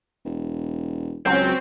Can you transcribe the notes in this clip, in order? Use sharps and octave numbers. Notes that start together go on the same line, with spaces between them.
E1
C#2 F#3 C4 C#4 C5 G5